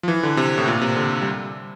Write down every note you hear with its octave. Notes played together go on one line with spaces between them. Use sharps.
F3
E3
D3
C3
A2
A#2
C3
D3
G3